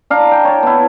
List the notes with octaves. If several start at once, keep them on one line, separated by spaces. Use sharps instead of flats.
D4 F5 A#5
G5
C#5 A5
B3 E4